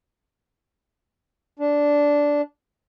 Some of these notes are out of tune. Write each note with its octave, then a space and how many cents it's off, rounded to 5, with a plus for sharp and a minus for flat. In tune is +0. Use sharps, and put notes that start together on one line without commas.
D4 -10